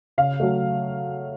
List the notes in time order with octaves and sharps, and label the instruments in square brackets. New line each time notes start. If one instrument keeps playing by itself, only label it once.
[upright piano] C#3 F5
F#3 A3